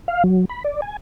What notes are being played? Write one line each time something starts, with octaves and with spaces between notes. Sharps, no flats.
F5
F#3
B5
D5
G#5